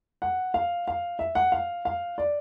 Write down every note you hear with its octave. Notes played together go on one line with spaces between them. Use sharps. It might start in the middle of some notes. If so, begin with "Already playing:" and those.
F#5
F5
F5
E5
F#5
F5
F5
D5